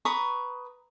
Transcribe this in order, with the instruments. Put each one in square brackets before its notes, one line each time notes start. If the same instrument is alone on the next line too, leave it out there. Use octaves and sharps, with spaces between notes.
[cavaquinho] B4 A#5 C#6 D#6